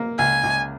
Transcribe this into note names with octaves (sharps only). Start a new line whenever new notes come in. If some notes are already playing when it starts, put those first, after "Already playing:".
Already playing: A#3
C#2 G#5
C#2